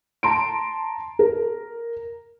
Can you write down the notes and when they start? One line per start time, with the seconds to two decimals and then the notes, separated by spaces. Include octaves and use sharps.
0.23 A5 A#5 C6 D7
1.19 A#4